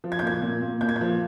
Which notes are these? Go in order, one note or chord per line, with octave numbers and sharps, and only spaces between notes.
F3
G#6
G6
A#2 G#6
A#2
A#2
A#2 G6
G#6
G6
F3